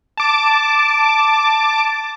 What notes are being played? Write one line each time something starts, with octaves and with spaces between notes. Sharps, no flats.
A5 D6